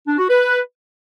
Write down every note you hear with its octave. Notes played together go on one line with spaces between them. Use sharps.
D4
F#4
B4